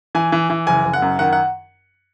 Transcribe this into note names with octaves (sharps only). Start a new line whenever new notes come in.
E3 G#5
E3
E3
F#1 G#5
F#1
F#5
F#2
D#3 F#5
F#5